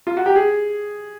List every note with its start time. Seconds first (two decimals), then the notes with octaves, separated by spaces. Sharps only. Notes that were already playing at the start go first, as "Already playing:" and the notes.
0.07 F4
0.17 F#4
0.26 G4
0.36 G#4